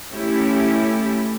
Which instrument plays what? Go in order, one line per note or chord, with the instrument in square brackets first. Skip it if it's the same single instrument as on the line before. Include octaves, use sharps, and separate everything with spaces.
[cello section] A3 C#4 E4 G4